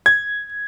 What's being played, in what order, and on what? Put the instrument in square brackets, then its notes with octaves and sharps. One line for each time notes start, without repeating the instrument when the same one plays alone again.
[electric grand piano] G#6